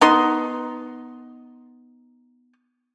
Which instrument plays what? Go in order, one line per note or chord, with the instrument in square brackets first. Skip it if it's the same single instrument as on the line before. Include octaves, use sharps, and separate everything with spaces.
[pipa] B3 D#4 C6